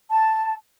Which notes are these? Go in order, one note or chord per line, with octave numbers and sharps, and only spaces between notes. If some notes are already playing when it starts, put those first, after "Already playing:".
A5